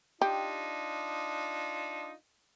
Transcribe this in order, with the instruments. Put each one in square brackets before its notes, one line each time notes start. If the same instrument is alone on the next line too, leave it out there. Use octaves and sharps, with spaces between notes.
[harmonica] D4 D#4 F4 [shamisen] G4